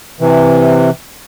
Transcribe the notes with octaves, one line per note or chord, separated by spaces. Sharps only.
C3 E3